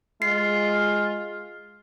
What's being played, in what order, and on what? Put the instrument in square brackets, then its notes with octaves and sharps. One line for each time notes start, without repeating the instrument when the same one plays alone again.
[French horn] G#3 [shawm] F4 [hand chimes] C7